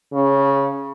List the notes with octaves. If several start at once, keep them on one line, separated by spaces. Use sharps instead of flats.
C#3